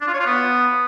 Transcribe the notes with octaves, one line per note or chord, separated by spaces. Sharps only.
D4
F4
C#5
F4
B3